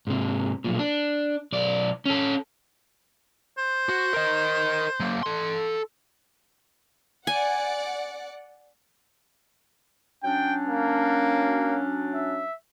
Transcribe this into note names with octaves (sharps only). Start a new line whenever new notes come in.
G#2 C3
B1 A#2
D4
B1 D5
C#4 A4
C5
F#4
A#4 D#5
F#3 A#3
A4 C6
D5 F#5 G#5
F#3 C#4 D4 G5
A#3
E5